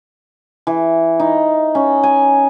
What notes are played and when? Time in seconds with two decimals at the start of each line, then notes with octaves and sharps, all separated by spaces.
0.67 E3
1.20 D#4
1.75 C#4
2.03 G#5